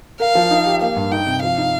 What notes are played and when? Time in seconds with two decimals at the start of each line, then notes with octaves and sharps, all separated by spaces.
0.20 A#4 F5
0.35 F3
0.51 D#4
0.66 G4
0.82 A#3 F5
0.96 G2
1.12 D#4 G5
1.27 C3
1.42 F3 F5
1.58 D#4